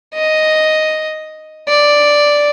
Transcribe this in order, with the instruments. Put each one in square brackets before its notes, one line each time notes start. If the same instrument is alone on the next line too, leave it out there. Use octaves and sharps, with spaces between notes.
[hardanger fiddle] D#5
D5